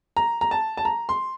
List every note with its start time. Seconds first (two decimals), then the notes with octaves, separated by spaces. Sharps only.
0.17 A#5
0.41 A#5
0.51 A5
0.77 A5
0.85 A#5
1.09 C6